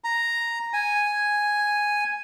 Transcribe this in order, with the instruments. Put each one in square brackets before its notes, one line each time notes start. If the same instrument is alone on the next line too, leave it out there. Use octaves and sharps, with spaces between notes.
[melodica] A#5
G#5